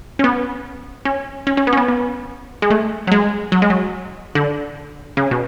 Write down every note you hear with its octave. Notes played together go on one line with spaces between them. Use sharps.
C#4
B3
C#4
C#4
C#4
B3
C#4
B3
B3
G#3
A3
F#3
G#3
F#3
G#3
F#3
D3
C#3
B2